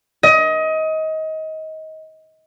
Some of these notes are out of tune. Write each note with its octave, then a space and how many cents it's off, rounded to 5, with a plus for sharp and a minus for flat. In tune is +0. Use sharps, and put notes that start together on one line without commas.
D#5 +25